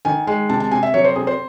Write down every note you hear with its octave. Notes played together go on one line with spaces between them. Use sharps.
D#3 G#5
G#3 G#5
C3 A5
A5
C3 G#5
E5
F#3 C#5
C5
C3 G#4
C5